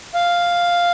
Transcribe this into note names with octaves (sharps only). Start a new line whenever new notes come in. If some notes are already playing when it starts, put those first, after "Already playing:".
F5